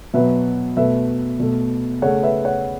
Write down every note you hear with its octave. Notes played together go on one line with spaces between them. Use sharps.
B2 F#3 B3 B4 E5
B2 A3 B4 E5
B2 A3
C#3 A3 C#5 F#5
B4 E5
C#5 F#5